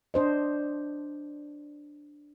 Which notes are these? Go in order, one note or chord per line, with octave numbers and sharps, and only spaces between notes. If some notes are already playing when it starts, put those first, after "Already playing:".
D4 C5 D#5